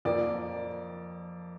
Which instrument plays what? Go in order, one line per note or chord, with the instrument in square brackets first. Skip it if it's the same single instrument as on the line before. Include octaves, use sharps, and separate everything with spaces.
[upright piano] F2 F3 A#3 D5